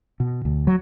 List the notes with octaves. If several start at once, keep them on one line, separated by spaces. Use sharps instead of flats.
B2
D2
F#3